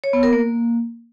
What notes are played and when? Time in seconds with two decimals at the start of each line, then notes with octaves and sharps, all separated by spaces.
0.04 C#5
0.13 B3
0.23 A#4
0.33 A#3